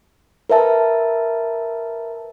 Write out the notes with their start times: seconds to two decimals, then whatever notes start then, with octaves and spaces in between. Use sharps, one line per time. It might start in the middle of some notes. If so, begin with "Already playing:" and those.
0.50 A#4 B4 E5 A5